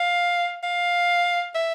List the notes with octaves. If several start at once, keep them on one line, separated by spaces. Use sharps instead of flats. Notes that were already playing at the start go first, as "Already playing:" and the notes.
Already playing: F5
F5
E5